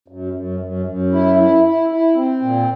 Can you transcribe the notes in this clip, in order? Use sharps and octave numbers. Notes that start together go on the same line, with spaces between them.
F#2
F#2
F#2
F#2
E4
E4
E4
E4
C4
A#2